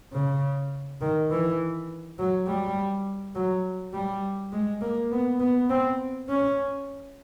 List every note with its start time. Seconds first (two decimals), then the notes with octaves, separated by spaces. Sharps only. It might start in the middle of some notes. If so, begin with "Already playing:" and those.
0.12 C#3
1.01 D#3
1.30 E3
2.18 F#3
2.47 G3
3.35 F#3
3.93 G3
4.53 G#3
4.81 A#3
5.12 B3
5.40 B3
5.69 C4
6.29 C#4